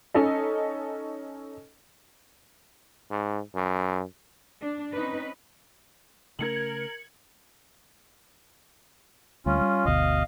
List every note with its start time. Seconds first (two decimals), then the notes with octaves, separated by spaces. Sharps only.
0.14 C#4 D#4 A4 D#5
3.11 G#2
3.55 F#2
4.61 D4
4.94 C4 C#4 D#4 B4
6.39 C#3 A3 C#4 A#4 G#6 C#7 F#7
9.46 D2 G3 C#4 F4
9.61 G3
9.85 G1 D2 B2 D#5 F5